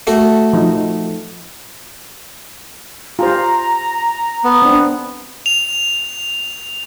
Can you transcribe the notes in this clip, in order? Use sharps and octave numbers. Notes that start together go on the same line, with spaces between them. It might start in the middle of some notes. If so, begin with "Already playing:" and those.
A3 F#4
F3 D#4
F4 G4 C5 A#5
B3
C4 D4
F7